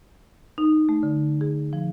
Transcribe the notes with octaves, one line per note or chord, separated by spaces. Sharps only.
D#4
A3
D3
G#4
F3